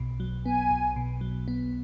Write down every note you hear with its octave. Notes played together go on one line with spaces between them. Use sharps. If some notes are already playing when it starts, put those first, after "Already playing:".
Already playing: B1 B2
F#3
B3 G#5
B1
B2
F#3
B3